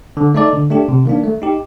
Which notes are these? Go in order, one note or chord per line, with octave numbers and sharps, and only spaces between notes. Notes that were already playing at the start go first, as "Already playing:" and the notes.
D3
A3 D#4 A4 D5
D3
A3 D4 G4
C3
D#3 A#3 D4
A3
D#4 G4